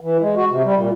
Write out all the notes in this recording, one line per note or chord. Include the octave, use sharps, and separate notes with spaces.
E3
G#3
F#4
C3
G3
A#2